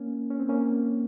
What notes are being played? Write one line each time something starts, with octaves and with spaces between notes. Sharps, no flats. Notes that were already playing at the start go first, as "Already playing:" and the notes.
Already playing: A#3 C#4
C#4
C4
A#3 C#4